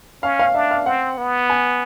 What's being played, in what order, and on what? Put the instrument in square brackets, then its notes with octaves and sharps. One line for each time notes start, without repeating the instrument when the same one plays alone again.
[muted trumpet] C#4 [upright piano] F5
[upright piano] F5
[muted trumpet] D4 [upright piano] E5
[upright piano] F5
[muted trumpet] C4 [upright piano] F#5
[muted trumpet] B3
[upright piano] G#5